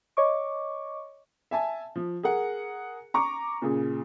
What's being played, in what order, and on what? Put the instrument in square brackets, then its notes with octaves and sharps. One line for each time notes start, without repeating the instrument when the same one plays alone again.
[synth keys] C#5 D#5 C#6 D6
[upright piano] E5 G#5 A5
F3
G#4 A#4 F#5
A#5 C#6 D6
A#2 C#3 G#4